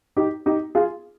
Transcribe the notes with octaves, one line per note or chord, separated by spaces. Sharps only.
D#4 G4
D#4 G4
F4 G#4